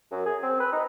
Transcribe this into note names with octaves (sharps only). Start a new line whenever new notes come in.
F#2
G#4
C4
B4
D#4